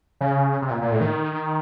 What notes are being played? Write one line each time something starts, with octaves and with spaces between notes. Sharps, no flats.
C#3
C3
A#2
A#2
A2
D#3